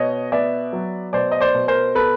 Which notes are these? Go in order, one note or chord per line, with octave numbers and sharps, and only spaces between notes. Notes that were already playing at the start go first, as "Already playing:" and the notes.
Already playing: B2 C#5 D#5
B3 D5 E5
F#3
B2 C5 D5
D#5
C5 D5
B2
A#4 C5
B3 A4 B4